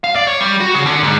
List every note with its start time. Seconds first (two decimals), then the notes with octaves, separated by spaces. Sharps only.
0.04 F5
0.16 D5
0.27 C#5
0.40 G3
0.60 F#4
0.75 C#3
0.86 D3
1.03 G#2